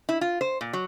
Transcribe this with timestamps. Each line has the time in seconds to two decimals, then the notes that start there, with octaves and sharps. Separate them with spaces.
0.09 E4
0.21 F4
0.41 C5
0.61 A#2
0.73 F#3